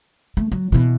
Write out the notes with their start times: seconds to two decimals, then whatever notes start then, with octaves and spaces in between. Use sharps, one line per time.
0.37 A3
0.52 F#3
0.72 B2 E3